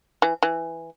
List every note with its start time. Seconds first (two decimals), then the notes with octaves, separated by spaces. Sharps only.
0.22 E3
0.43 E3